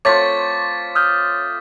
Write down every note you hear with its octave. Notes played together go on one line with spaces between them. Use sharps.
A3 C4 F4 C#5 D6 A6 B6
D#6 F6 G6